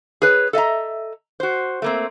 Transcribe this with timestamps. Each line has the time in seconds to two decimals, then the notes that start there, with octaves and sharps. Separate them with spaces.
0.22 G#4 B4 C#5
0.53 A4 D#5 E5 A#5
1.40 F#4 C5
1.82 A3 A#3 C4